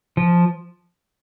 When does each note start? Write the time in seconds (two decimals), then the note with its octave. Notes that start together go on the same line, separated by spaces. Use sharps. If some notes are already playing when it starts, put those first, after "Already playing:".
0.17 F3